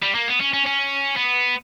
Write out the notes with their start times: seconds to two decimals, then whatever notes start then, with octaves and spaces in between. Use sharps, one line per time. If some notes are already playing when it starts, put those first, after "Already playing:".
0.03 G3
0.15 A#3
0.28 B3
0.41 C#4
0.54 C#4
0.66 C#4
1.17 B3